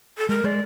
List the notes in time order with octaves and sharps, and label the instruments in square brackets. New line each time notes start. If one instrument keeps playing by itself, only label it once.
[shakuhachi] A4
[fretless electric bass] G#3 [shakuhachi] A#4
[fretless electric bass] G#3 [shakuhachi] D5